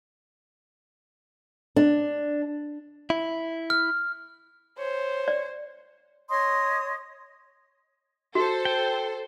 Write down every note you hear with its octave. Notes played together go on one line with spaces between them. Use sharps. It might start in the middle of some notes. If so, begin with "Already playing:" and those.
D4
E4
F6
C5 C#5
D5
C#5 D#5 C6 D#6
F#4 A4 C5
G5